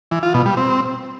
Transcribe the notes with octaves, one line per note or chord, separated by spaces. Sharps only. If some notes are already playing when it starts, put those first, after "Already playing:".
E3
F4
B2
G3
C4